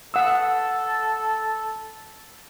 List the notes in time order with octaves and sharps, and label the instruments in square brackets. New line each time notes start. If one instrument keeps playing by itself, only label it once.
[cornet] A4 [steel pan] F#5 D#6 E6